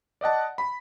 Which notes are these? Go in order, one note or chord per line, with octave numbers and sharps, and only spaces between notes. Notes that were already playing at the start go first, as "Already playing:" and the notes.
D5 D#5 F#5 A5
B5